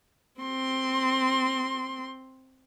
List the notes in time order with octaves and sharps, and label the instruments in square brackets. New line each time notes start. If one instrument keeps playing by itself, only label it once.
[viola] C4 C6